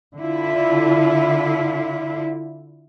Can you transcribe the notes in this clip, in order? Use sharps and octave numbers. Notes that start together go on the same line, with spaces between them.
D3 E4 F4